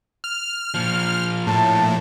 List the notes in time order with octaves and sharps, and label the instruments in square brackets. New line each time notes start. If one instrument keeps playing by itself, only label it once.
[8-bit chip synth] F6
[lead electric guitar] A#2 F3
[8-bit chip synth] A2 [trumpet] A5